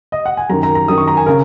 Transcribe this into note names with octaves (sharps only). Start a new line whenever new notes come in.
D#5
F#5
G#5
F#2 D#3 A#5
A#5
A#5
F#2 D#3 D#6
C#6
A#5
G#5
C#3 A#4